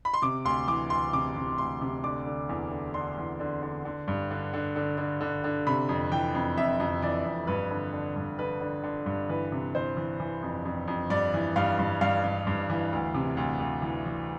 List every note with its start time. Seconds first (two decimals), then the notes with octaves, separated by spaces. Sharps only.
0.05 B5
0.14 C6
0.22 C3 D6
0.45 D2 C6
0.68 E3 D6
0.90 D2 C6
1.13 C3 D6
1.36 C3
1.58 D2 C6
1.81 C3
2.03 D3 D6
2.27 D3
2.49 E2
2.71 D3
2.94 D3 C6
3.18 E2
3.40 D3
3.63 D3
3.85 D3
4.08 G2
4.31 D3
4.54 D3
4.76 D3
4.98 D3
5.21 D3
5.44 D3
5.67 C3 B5
5.89 F2
6.12 E3 G5
6.35 F2
6.57 F2 E5
6.80 F2
7.02 E3 D5
7.25 F2
7.47 G2 B4
7.71 D3
7.93 D3
8.16 G2
8.39 D3 B4
8.61 D3
8.84 D3
9.06 G2
9.29 E3 B4
9.52 C3
9.75 E3 C5
9.97 E3
10.20 E3
10.43 F2
10.65 F2
10.88 F2
11.10 G2 D5
11.34 E3
11.56 G2 F5
11.79 G2
12.01 G2 F5
12.24 G2
12.47 G2
12.70 E3
12.93 D2
13.14 C3
13.37 D2
13.60 D2
13.82 E3
14.06 E3